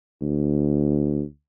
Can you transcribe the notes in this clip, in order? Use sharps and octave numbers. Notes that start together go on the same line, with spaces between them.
D2